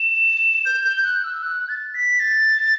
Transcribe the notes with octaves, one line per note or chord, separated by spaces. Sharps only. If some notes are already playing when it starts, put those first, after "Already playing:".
Already playing: E7
G6
G6
F#6
E6
F#6
A6
B6
A6